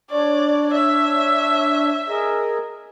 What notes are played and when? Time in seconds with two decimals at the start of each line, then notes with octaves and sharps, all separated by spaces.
0.11 D4 C#5 D5
0.74 E5
2.09 G#4 A#4 D#5